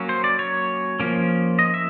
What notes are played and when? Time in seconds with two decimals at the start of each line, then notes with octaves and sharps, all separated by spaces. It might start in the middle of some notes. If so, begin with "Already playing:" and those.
Already playing: F#3 A#3 C#4
0.09 C5
0.24 D5
0.39 C#5
1.00 F3 A#3 C#4
1.59 D#5
1.74 E5